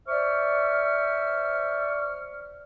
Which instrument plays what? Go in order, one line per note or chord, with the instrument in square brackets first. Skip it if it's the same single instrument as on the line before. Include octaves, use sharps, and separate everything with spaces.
[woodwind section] C5 D5 E5 C#6 F6